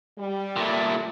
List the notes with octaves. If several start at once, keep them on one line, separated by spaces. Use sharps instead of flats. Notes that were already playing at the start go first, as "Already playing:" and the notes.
G3
A#2 A3